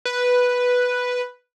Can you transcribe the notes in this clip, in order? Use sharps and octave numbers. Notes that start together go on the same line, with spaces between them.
B4